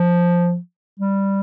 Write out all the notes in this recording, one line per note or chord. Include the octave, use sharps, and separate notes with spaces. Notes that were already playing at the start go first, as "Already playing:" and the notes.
Already playing: F3
G3